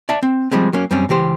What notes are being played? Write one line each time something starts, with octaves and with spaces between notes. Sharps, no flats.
D5 E5 A5
C4
F3 G3 G#3 C4
F#3 A#3 C#4
F#2 G3 C4 C#4
C#2 E3 G4 C5